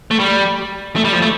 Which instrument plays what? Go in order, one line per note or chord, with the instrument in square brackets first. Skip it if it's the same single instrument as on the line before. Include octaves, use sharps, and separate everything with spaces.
[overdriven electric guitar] A3
G3
A3
G3
F3
A3